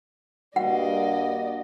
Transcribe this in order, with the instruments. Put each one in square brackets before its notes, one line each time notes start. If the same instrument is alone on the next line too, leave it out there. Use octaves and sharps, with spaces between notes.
[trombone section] G2 A#3 [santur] F#4 [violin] D5 D#5 [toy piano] F#5